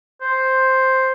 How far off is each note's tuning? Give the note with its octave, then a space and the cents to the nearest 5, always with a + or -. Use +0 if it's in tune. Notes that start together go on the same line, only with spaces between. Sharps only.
C5 +5